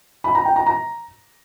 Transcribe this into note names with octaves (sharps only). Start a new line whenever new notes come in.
B5
A#5
G5
A#5
A#5